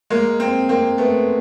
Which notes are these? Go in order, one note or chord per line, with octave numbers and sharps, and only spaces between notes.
G#3 A#3
A#3 C4
A#3 C4
A3 B3